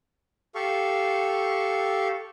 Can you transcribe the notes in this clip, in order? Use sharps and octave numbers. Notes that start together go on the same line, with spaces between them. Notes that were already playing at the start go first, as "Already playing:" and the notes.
G4 A4 F5 C#6